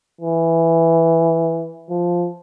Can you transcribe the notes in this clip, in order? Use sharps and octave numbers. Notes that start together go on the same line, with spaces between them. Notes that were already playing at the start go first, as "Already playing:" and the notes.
E3
F3